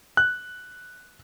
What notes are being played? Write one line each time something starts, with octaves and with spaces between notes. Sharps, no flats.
F#6